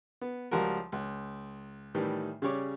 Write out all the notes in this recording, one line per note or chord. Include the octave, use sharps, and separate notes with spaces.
B3
C#2 F3 G3 F#4 A#4
C#2
A2 D#3 E3 G3
C#3 G3 C#5 D6